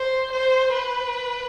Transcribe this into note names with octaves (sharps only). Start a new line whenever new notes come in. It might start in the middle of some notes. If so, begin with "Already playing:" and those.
Already playing: C5
C5
B4